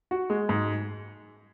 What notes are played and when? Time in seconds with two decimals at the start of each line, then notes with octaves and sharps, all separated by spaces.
0.11 F#4
0.30 G#3
0.49 G#2